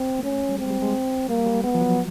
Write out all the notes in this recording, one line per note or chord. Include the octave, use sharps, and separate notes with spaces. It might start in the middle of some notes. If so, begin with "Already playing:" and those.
Already playing: C4
A#3
A3 C#4
G3
G#3 C4
G3
G#3
G3 A#3
G3
G#3 B3
F3
F#3